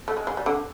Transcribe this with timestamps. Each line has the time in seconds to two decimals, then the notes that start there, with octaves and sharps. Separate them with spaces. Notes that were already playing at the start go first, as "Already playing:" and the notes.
0.08 A3
0.17 G#3
0.27 G#3
0.37 G3
0.46 D3